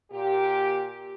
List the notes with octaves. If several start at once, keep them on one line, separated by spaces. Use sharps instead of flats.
A#2 G4